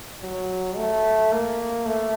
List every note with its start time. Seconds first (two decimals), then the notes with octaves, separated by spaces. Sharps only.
0.22 F#3
0.77 A3
1.32 A#3
1.86 A3